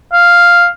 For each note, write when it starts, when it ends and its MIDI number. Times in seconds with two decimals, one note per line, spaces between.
0.13 0.66 77